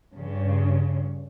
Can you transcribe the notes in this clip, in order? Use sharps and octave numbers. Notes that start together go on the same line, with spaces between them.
G2 C#3